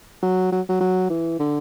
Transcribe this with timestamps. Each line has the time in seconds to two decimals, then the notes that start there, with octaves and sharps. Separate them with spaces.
0.22 F#3
0.52 F#3
0.69 F#3
0.81 F#3
1.10 E3
1.39 D3